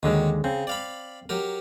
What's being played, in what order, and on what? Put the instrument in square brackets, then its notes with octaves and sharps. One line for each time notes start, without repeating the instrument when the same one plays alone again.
[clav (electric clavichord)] D#2 D3 G#3 [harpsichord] D#3 F#3
[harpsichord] C#3 [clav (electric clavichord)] C4
[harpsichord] D5 F5 B5
F#3 G4 A#4